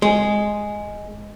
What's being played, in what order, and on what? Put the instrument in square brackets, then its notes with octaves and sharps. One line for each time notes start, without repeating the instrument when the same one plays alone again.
[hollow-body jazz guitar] G#3